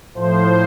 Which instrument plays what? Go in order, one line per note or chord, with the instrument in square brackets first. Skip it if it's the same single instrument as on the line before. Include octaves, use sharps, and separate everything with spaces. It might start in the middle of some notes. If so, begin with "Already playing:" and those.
[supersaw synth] A2 F3 C5